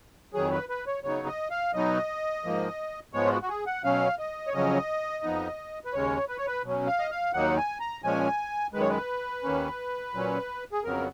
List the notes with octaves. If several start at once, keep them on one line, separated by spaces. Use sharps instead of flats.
F2 D#3 F#3 G#4
B4
B4
C#5
C#3 F#3 B3 D#4 C#5
D#5
F5
B2 F#3 B3 D#4 D#5
G#2 F3 A#3
G#2 F3 G#3 B3 C#5
F4
F#4
F#4
G#4
F#5
B2 F#3 C#4 F5
D#5
C#5
F2 C#3 F#3 C#4 D#5
F2 F3 B3 D#4
B4
D#2 C#3 G#3 C#4 C#5
B4
C#5
B4
B2 F#3 C#4
F5
D#5
F5
D#2 D#3 F#3 A#3 D#4 F#5
G#5
A#5
A#2 F3 G#3 C#4 G#5
F#2 D#3 G#3 B4
C#5
B4
D#2 D#3 A#3 C#4
A#2 F#3 C#4
G#4
F2 C#3 F#3 B3 A#4